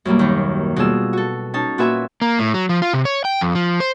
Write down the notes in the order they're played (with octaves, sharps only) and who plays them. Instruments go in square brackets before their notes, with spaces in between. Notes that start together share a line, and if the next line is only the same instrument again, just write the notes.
[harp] F#2 B2 G3 A#3
D#2 D#3
B2 G3 F4 G#4 E6
F#4 A4
C#4 D#4 A5
A#2 F#4 B4 E5 G#5 E6
[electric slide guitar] A#3
A2
F#3
F3
F4
C3
C#5
G5
F2
F3
C5